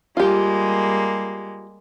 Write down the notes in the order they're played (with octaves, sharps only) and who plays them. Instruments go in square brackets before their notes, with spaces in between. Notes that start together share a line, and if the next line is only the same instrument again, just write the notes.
[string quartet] G3 G#3 A#3 [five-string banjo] F4 G4